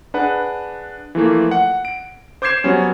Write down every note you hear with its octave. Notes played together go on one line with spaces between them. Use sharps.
D4 G#4 B4 F#5
E3 F3 A3 A#3
F#5
D7
C5 D6 G6 G#6 C7 E7
F#3 G3 B3 C#4